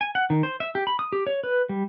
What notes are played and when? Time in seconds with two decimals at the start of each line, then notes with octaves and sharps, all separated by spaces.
0.01 G#5
0.15 F#5
0.30 D#3
0.43 C5
0.60 E5
0.75 G4
0.87 B5
0.99 D#6
1.12 G4
1.27 C#5
1.44 B4
1.69 G3